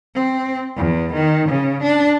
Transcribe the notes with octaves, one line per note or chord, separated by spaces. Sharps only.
C4
E2
D#3
C#3
D4